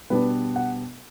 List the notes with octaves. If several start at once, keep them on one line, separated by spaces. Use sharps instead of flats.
B2 G3 B3 D4 B4
F#5